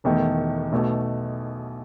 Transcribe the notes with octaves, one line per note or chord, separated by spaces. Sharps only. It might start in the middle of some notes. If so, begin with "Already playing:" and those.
E1 E2 D#3 A3
B1 B2 A3